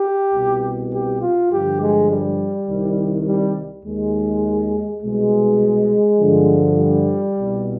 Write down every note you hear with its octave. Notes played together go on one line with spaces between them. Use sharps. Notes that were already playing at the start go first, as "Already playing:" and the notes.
Already playing: G4
C2 B2
G4
F4
G2 D3 F3 G4
G#3
G3
C2 C3 D#3
G3
D#2 D#3 G#3
C2 B2 G#3
G2 D3 F3
G3
C2 B2